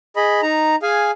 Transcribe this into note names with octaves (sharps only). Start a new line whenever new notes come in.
G#4 D#5 B5
D#4 A#5
G#4 F5 G#5